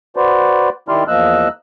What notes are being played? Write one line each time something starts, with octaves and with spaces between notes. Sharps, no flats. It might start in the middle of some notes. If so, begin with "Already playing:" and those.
F#4 B4 C5 D5
D#3 E4 G4 D5 C6 F6
E2 F3 A#3 D#5 E6 F#6